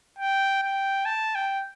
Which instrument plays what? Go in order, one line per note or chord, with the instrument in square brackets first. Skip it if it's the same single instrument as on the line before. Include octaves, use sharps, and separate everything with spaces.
[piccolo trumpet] G5
G5
A5
G5